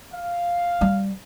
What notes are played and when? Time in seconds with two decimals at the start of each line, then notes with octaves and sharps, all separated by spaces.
0.15 F5
0.81 G3